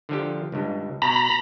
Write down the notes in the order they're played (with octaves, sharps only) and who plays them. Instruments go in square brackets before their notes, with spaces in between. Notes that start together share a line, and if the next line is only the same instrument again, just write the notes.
[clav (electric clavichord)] D3 F3 G4
C#2 G2
[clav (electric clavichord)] B2 [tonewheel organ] A#5 B5